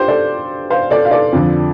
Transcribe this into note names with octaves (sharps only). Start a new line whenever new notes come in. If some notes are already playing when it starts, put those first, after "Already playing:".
Already playing: D4 F4 G4 C5
A4 D5
C5 F5
A4 D5
F5
A4 D5
F2 D3 F3